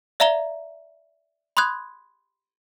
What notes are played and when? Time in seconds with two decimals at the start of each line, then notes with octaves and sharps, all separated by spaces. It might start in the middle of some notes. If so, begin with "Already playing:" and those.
0.20 D5 E5 F5 A#5 F7 G7
1.57 B5 C6 D#6 F#6 G#6